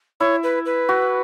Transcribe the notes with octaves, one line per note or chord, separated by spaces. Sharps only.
E4 C#5
B4
B4
F#4